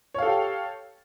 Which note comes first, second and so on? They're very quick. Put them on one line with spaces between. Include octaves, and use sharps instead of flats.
C#5 F5 A4 G4